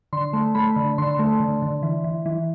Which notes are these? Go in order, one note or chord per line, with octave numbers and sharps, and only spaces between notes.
D3 C6
A3
A3 B5
D3
D3 C6
A3
D3
D3
E3
E3
E3